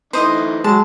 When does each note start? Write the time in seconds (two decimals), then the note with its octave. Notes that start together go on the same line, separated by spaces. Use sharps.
0.13 E3 A3 D#4 C5 D#5
0.64 F#3 G#3 A5